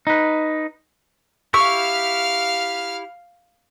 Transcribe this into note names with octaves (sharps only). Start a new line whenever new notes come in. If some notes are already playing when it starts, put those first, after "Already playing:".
D#4 B4
E4 G4 F5 C#6 E6 F6